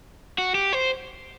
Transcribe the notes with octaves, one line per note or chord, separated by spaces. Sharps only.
F#4
G4
C5